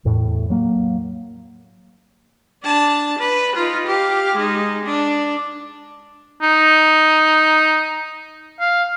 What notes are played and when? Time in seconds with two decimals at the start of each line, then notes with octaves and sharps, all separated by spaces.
0.05 E2 A2
0.50 F#3 A#3
2.64 D4 A5
3.19 B4
3.56 D#4 F4
3.87 G4 F5
4.36 G#3 D#4
4.84 D4
6.43 D#4
8.61 F5